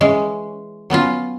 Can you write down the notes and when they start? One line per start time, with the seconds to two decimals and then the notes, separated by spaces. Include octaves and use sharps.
0.01 E3 G#3 C#4
0.90 F#3 B3 C#4 F4